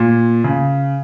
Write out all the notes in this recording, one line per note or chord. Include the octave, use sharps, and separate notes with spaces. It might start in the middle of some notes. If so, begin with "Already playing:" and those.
Already playing: A#2
C#3